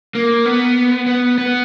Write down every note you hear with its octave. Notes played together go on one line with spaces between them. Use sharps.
A#3
B3
B3
B3